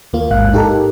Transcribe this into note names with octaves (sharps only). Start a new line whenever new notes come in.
D#2 A#3 F4
A1 G#2 F5 F#6
D#4 G4 A4 A#4